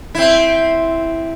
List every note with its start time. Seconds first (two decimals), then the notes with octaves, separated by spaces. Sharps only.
0.15 C4 E4